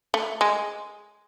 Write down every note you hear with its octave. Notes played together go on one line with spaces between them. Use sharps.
A3
G#3